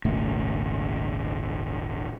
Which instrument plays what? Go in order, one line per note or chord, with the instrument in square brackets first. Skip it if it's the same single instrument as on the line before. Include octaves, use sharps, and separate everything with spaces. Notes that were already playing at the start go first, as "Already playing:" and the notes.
[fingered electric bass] D#1 G#1 C#3 A3